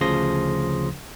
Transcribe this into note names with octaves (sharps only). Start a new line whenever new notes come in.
D2 C#3 F3 C6 D#6 A#6